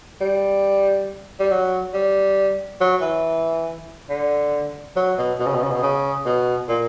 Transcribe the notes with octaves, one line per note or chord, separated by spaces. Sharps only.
G3
G3
F#3
G3
F#3
E3
D3
F#3
B2
B2
C#3
B2
C#3
B2
C#3
B2
A#2